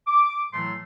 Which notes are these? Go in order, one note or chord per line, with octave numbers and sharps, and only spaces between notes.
D6
A2 E3 F#3 A3 C6